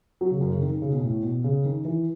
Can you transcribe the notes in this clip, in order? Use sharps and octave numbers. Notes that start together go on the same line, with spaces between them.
F#3
C#3
F#2
C#3
D#3
D#3
C#3
B2
A2
B2
C#3
D#3
E3